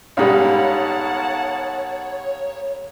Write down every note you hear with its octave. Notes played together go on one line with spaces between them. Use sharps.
B1 G#2 G3 A#4 C#5 F5 F#5 A5